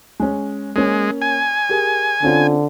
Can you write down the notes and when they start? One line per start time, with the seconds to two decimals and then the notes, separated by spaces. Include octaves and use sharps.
0.20 G#3 C#4
0.76 G#3 A#3 C#4
1.22 G#5
1.69 G4 G#4 A#4
2.23 D3 C4 C#4 F4